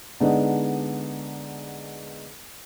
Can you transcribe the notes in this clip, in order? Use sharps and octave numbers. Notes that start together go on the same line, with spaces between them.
D3 G#3 B3 D4 D#4